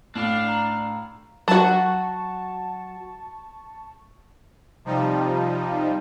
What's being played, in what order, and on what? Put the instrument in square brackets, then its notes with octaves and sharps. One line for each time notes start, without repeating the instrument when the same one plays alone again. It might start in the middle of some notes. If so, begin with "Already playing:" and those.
[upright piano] A2 [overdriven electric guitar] D4 D5 [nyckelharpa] F5
[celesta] A#5
[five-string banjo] F#3 F#4 [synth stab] A5 C#6
[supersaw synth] C3 F3 G3 D#4